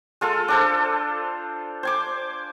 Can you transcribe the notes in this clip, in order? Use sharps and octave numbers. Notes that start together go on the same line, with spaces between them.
G#3 F4 A4
D4 A4 C5
C5 G#5 D6